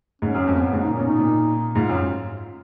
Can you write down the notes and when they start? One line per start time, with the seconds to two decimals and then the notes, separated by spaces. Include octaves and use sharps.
0.22 G#2 C#4
0.34 F#2
0.47 F2
0.53 A#3
0.60 F#2 B3
0.73 G#2
0.80 D#4
0.86 A#2
0.94 C#4
0.99 B2
1.06 D#4
1.18 A#2
1.75 G#2 F4
1.89 F#2